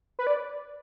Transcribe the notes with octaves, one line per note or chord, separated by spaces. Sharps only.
B4
D5